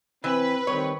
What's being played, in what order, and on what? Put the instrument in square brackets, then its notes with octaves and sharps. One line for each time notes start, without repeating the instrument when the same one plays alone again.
[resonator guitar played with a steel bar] E3 [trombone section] C4 [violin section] B4
[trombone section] D#3 G3 C4 [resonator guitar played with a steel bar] C#5